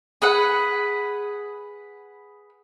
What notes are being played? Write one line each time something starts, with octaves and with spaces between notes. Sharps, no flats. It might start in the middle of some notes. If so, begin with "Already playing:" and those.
G#4 B4 F#5